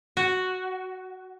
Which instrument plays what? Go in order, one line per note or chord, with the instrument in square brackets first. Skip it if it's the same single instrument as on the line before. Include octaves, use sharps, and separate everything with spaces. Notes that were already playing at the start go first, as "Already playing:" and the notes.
[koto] F#4